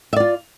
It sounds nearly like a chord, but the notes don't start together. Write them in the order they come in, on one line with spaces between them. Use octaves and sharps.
E5 D5 F4